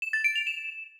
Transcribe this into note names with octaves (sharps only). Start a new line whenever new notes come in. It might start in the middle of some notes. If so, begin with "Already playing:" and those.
E7
A6
D7
F7
E7